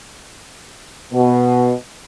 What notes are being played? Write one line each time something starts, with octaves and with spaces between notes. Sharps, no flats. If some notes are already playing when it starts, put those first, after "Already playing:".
B2